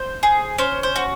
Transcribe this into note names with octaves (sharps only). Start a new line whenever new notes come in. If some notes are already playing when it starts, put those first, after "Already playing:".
Already playing: C5
G#4
C#4 C5
C5
F#4